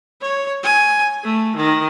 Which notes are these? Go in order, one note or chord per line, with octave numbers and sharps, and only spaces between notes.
C#5
G#5
A3
D#3